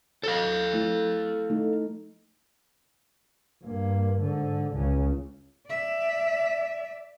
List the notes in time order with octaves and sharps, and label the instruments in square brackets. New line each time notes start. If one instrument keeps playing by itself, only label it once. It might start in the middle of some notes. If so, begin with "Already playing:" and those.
[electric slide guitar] A4 F5 [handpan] C#5
[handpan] F3 A3 E4
A3 D#4
[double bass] G2 A#3
G#2 D3
C#2 C#3
[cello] D5 E5